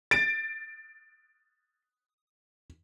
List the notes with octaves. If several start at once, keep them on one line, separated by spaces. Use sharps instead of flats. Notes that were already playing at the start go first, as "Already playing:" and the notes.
A6 D7